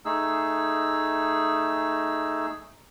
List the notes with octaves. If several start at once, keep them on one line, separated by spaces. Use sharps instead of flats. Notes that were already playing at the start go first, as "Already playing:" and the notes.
A3 D#4 G#4 E6